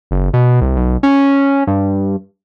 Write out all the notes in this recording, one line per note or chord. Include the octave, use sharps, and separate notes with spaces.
F#1
B2
C2
B1
C#4
G2